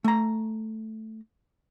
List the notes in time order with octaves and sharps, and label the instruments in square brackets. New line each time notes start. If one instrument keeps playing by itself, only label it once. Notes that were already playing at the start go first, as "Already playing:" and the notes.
[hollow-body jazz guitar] A3 A#5